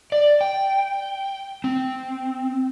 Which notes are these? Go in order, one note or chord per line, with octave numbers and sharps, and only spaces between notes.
D5
G5
C4